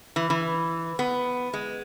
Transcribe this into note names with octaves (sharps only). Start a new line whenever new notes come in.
E3
E3
B3
G#3